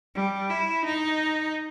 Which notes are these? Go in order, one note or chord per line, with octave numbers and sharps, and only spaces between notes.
G3
E4
D#4